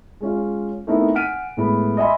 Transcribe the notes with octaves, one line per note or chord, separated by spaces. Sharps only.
G#3 C#4 F4
A3 B3 C4 D#4 E4 A#4
F#5 G#5 F6 B6 D7 D#7
A2 G#3 B3 B5
D#5 E5 G#5 B5 C6